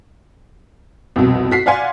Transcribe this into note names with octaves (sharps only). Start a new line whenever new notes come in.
C2 F2 B2
F#4 B6 C7
D5 F5 F#5 G#5 C6